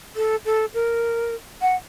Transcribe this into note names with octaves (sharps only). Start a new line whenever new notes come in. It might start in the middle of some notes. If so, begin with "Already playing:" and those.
A4
A4
A#4
F#5